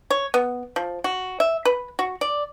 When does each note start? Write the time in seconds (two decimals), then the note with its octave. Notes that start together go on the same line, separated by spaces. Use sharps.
0.10 C#5
0.34 B3
0.76 F3
1.04 F#4
1.40 E5
1.65 B4
1.99 F#4
2.21 D5